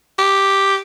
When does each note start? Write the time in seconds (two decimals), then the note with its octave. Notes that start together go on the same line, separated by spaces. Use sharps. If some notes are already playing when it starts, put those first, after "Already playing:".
0.19 G4